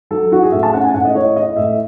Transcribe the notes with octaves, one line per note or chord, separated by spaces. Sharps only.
F#3 A4
E4 F#4
G#4
A2 E5
A5
C#4 F#5
G#5
A2 F#5
D#5
E4 C#5
E4 D#5
A2 E5